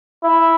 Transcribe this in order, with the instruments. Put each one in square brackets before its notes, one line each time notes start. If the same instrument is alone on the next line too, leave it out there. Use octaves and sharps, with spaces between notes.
[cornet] E4